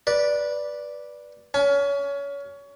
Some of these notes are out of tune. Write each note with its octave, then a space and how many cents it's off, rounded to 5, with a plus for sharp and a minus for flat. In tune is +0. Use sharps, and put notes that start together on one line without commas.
B4 -15 D5 +0
C#4 +25 G#5 +25